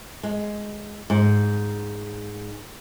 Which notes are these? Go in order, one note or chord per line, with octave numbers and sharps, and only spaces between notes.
G#3
G#2